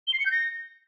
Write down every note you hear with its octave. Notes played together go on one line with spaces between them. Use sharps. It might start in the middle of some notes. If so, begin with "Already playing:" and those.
G7
C7
C#7
G6
A#6